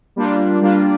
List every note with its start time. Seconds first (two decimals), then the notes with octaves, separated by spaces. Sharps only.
0.16 G3 A#3 D4 F4
0.61 G3 A#3 D4 F4